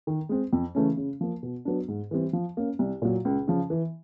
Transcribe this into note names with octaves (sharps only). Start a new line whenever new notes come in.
D#3
G#3 C4
F2
C#3 E3 A3 C#4
C#3
F3 A#3
B2
F#3 B3 D4
G#2
E3 G3 C4
F3
A#3 C#4
C2
A#2 F#3
C#2
C#3 F3
E3